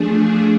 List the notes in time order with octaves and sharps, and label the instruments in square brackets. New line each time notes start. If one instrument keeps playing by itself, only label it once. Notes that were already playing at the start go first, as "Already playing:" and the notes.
Already playing: [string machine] F3 A3 D4 G#4